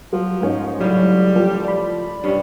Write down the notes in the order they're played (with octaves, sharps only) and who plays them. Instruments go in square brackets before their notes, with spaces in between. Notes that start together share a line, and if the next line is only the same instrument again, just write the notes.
[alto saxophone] F3 [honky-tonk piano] F#3
[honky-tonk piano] G#2 C#4 D#4
[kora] A2 C#3 [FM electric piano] F#3 [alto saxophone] G3
[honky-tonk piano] F3 [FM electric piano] G4
[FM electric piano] D5 B5
[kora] G2 C3 [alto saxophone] C#4